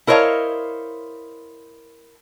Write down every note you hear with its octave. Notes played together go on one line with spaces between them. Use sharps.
E4 A#4 C5 C#5 D#5 F5